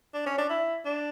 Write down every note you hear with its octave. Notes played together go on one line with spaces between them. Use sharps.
D4
C#4
D4
E4
D4